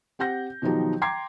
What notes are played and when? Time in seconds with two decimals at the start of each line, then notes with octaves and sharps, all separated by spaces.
0.19 C4 G4 F#5 G6 A#6
0.62 B2 D#3 F3 F#3 D#4 G4
1.02 G5 A#5 C6 D6 G#6 C7